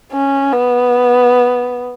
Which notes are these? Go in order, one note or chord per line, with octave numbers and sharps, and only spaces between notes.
C#4
B3